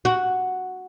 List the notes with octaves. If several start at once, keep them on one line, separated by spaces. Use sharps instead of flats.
F#4